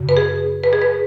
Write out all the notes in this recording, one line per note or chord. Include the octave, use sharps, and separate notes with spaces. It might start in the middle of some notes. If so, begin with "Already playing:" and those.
Already playing: F#2 C#3
B4
G#4
B4
G#4
B4